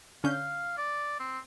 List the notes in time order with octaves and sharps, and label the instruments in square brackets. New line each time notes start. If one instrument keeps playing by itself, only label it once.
[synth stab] D3 C#4 G6 [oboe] F5
[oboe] D5
C4